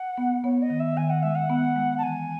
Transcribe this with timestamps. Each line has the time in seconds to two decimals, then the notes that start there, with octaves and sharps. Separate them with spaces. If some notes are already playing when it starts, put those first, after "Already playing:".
Already playing: F#5
0.18 B3
0.44 B3 C#5
0.62 D#5
0.70 D#3
0.79 E5
0.97 D#3 G#5
1.09 F#5
1.22 G#3 E5
1.35 F#5
1.50 B3
1.76 G#3
1.97 A5
2.03 E3 G#5